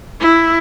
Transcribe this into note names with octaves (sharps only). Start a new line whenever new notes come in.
E4